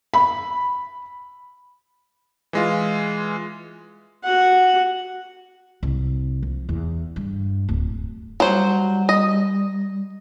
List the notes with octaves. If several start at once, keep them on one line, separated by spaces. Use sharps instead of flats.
B5
E3 G#3 F4
F#4 F#5
C2
F3
E2
G2
D1
F#3 G3 C5
D#5